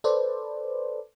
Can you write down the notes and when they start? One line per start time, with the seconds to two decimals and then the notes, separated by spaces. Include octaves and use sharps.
0.04 A4 B4 C5 D5